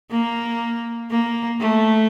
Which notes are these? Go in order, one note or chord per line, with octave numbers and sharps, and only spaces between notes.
A#3
A#3
A3